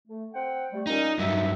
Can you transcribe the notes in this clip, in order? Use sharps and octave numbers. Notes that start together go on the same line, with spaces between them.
A3
C4 F#5 G5
G3 A3
A#2 G3 C#4 D#4
G2 F#3 D#4 E5